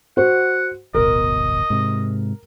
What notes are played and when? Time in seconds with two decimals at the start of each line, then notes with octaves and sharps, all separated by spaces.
0.17 F#4 C5 F#5
0.94 D1 G1 B2 A#4 D#5
1.70 G#2 C3